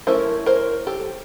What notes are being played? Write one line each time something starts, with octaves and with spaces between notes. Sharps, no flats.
A3 C#4 E4 A#4 C5
A#4 C5
G4 A4